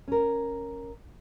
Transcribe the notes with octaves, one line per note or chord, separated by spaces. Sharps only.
C#4 A#4